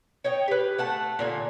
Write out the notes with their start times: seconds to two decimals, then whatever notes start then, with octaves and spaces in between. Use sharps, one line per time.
0.24 C#5 D#5 G5
0.48 G4 B4
0.78 A3 F#5 A5
1.19 A#2 D3 G#5